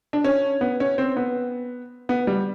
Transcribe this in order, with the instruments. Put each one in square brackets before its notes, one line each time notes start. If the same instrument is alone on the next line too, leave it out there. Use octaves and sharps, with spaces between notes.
[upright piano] D4
C#4
B3
C#4
C4
B3
B3
G3